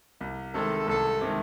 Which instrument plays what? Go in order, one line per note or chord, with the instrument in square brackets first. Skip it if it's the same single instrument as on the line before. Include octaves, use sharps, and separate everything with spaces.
[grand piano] C2
[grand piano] C3 D#3 G#3 [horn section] A4
[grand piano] C2 [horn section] A4
[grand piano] C3 D#3 G#3